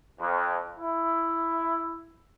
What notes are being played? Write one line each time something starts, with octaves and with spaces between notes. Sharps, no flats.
F2
E4